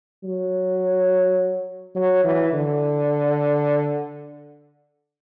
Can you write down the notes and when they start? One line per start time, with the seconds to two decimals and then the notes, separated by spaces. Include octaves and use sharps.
0.24 F#3
1.95 F#3
2.24 E3
2.53 D3